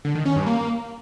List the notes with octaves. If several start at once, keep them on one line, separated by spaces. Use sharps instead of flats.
D3
D#3
C#4
G2
A#3